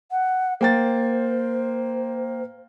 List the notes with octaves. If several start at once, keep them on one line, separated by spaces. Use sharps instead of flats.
F#5
A#3 C5 G5 A6